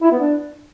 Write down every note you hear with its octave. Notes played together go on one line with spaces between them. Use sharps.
E4
B3
D4